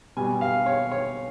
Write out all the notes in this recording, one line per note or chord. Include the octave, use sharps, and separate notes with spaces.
B2 G3 G#5
F5
C#5
C#5